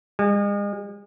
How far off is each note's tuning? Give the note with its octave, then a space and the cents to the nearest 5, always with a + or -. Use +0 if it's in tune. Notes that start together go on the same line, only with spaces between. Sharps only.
G#3 -40